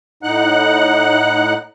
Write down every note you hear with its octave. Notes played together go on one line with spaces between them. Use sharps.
A2 D#4 F#5 F#6